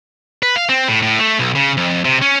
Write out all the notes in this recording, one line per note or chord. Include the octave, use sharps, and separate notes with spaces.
B4
F5
C4
A2
A2
A3
B1
C#3
F2
C3
C#4